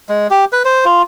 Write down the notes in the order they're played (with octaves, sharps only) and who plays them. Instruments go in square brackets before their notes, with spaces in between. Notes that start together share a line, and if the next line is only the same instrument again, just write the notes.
[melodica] G#3
G4
B4
C5
F4